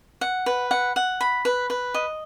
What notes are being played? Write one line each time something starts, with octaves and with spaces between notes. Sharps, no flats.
F#5
B4
F#5
F#5
B5
B4
B4
D#5